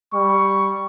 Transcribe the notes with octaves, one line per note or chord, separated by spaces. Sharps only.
G3 C#6